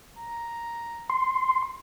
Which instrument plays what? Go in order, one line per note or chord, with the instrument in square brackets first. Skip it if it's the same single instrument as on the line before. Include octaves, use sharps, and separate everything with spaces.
[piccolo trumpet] A#5
[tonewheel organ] C6